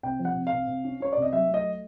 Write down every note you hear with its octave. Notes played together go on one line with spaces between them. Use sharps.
C3 G5
F3
F#5
C3
F5
C3
C3
C#4
C#4 C#5
C3 D5
D#5
F#3 E5
A3
D#5